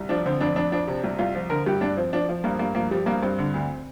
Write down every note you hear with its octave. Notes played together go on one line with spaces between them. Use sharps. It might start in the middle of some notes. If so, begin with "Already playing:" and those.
Already playing: C2
F3 D4
D3 C4
F2 D4
F2 D4
F3 D4
C3
C2
C2 F4
F3
D3 A#4
G2 G4
G2 D4
F3 C4
F3 D4
F3
G2 A#3
G2 A#3
F3 A#3
F3 G3
G2 A#3
G2 C4
D3
D2